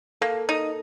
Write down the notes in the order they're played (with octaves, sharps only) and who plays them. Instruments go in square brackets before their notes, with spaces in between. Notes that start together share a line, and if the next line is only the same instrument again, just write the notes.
[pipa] A#3 [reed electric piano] A4
[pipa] D#4